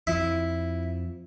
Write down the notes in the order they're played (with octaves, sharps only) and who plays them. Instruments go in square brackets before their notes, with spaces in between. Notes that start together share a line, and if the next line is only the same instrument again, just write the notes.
[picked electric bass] F2 F3 [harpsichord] E4